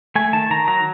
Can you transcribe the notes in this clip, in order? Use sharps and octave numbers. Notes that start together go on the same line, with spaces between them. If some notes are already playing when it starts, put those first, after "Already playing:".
A3 G#5
D#3 A5
D#3 A#5
F#3 A#5